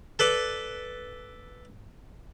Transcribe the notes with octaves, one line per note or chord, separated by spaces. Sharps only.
A4 B4 D5